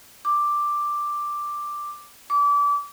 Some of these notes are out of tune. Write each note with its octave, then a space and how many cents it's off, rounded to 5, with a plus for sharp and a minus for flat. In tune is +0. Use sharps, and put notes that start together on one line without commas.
D6 +5
D6 -30